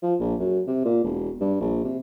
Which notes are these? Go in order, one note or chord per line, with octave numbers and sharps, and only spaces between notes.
F3
A#1
F#2
C3
A#2
E1
G2
A#1
C3